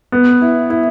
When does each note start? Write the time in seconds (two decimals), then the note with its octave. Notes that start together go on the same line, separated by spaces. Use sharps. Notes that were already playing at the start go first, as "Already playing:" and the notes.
0.12 B3
0.41 E4
0.70 E4